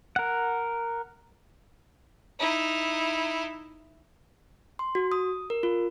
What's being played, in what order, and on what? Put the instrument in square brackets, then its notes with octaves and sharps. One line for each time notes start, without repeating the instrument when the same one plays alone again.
[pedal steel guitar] A#4 F#5
[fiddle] D#4 E4
[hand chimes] C6
F#4
D#6
A#4
F4